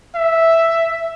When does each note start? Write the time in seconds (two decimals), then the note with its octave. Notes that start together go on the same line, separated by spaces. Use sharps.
0.15 E5